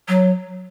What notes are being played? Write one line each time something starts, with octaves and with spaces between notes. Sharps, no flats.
F#3